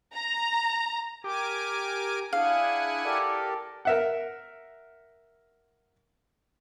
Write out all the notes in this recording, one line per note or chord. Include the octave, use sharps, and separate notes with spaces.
A#5
G4 A#4 G#5 D6
D4 E4 G#4 F5 F#5 G#5
G4 A4 A#4 D5
A#4 E5 F#5